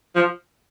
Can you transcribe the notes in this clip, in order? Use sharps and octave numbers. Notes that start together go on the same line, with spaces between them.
F3